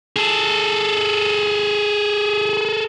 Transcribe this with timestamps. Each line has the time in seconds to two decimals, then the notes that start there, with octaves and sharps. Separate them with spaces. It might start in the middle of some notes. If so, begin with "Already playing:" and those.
0.16 G#4 A4